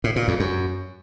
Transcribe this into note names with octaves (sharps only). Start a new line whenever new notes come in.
A2
A#2
F2
F#2